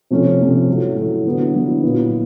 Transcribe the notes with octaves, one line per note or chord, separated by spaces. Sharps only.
C3 F3 A3 C#4
C3 F3 A3 C#4
A2 F#3 A3
A2 F#3 A3
D3 F#3 B3 E4
D3 F#3 B3 E4
A#2 F#3 B3 E4